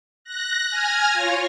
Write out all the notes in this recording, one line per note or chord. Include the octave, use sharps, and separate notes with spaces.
F#6 A#6
G#5 F6 G#6 A#6
F4 C#5